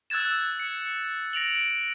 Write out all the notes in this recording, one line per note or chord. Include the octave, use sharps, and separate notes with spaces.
E6 F#6 G#6 A6 E7
C#7
A#6 D7 F7 F#7